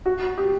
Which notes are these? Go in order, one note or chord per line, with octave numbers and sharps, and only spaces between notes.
F#4
G4